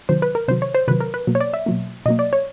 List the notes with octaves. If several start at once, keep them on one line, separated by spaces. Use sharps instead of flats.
C3 D#3 F#3 C5
B4
A#4
C3 D#3 F#3 C5
C#5
C5
C3 D#3 F#3 B4
A#4
B4
B2 F#3 A#3
C#5
D5
E5
B2 F#3 A#3
B2 F#3 A#3 D#5
D5
C#5